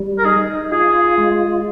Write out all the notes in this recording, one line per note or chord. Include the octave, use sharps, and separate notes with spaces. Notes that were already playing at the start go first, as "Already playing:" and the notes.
Already playing: G3
A#4
D#4 G#4
F4 G#4
G#3